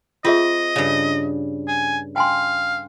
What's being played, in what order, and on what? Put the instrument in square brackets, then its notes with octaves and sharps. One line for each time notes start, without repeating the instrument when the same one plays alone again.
[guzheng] C4 [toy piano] F4 G#4 E5 [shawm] D#5
[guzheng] G2 C#3
[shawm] G#5
[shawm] F5 [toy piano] G5 G#5 C6